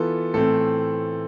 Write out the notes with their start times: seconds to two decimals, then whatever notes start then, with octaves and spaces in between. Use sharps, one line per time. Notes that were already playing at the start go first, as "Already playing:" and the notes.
Already playing: E3 B3 F4 A4
0.34 A2 E3 A3 C4 A4